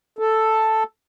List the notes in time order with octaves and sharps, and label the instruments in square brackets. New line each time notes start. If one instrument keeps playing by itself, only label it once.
[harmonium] A4